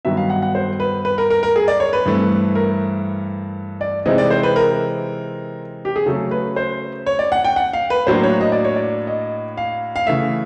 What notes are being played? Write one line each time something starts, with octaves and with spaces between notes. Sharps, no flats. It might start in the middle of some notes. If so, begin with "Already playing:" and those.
G2 D#3 F#3 B3 E5
F5
F#5
F#5
C5
B4
B4
A#4
A#4
A#4
G#4
D5
C#5
B4
G2 E3 A3 C4
A#4
D5
C3 E3 G#3 C4 D#4 D#5
D5
C5
B4
A#4
G4
G#4
C#3 F#3 A3 C#4 A4
B4
C5
C#5
D5
F#5
G5
F#5
F5
B4
A2 F#3 A#3 D4 C5
C#5
D#5
D5
C#5
D5
D#5
F5
F5
C#3 E3 A3 E5